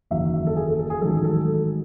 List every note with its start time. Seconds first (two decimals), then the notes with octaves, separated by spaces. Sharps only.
0.11 F#1 E2 D#3 F#3 E5
0.47 A4
0.56 G#4
0.68 A4
0.79 A4
0.90 G#4
1.01 A1 G#2 D#3 F#3 A4
1.25 A4